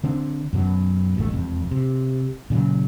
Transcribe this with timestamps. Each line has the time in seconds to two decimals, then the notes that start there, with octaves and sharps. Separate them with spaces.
0.04 D3 C4 D4
0.53 F#2 B2 F#3
1.17 D1 A1 G#2 A3
1.31 E1 F2
1.71 C3
2.50 A#2 C#3 F3 F#3